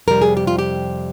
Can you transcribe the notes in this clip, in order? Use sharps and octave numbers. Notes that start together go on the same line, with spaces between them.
F2 C3 G3 A#4
G#4
G4
F4
G4